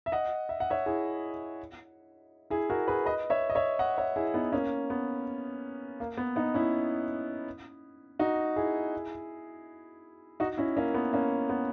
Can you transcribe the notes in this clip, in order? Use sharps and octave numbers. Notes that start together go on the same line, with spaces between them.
E5
D#5 F#5
E5
F#5
C#5 E5
E4 G#4
E4 G#4
F#4 A#4
G#4 B4
B4 D#5
C#5 E5
D#5
C#5 E5
D#5 F#5
C#5 E5
E4 G#4
B3 D#4
A#3 C#4
B3
A#3
B3
B3 D#4
C#4 E4
D#4 F#4
E4 G#4
D#4 F#4
C#4 E4
A#3 C#4
B3
A#3 C#4
B3